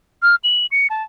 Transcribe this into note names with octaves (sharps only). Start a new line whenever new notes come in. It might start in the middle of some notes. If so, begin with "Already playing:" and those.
F6
F#7
C#7
A5